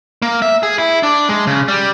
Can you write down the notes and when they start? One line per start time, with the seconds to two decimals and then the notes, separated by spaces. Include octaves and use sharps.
0.22 A#3
0.42 E5
0.63 G#4
0.78 E4
1.03 D4
1.29 G#3
1.47 C#3
1.68 G3